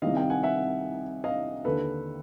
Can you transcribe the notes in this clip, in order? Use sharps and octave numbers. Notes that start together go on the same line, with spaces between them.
C2 C3 D#3 D#5 F5
F5 G5
F#5 G#5
E5 F#5
D#5 F5
D#2 D3 A4 B4